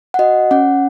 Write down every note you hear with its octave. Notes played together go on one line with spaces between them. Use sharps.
F#5
F#4 D#5
C#4 F#5